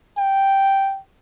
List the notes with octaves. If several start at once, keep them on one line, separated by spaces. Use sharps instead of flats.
G5